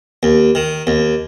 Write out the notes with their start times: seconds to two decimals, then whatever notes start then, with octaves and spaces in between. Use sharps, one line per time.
0.23 D#2
0.55 D#3
0.87 D#2